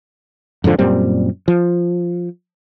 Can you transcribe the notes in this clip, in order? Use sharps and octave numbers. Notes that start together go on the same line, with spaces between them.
F2 G#2 D3 F3
F#2 A#2 G3 C4
F3